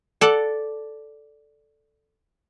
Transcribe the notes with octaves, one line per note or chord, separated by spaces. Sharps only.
A4 D5 F#5